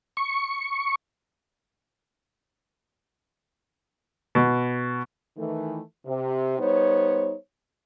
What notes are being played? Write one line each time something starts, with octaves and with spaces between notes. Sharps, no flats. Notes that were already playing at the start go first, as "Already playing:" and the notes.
C#6
B2
D#3 E3 A3
C3
G3 B3 D#4 C5 C#5